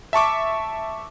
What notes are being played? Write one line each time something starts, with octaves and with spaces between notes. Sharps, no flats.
E5 A5 C#6 D6